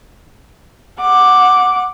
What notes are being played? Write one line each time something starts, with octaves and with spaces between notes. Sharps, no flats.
F#5 D6